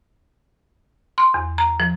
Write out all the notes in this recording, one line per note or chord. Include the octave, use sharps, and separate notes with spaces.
C6
E2
A#5
F3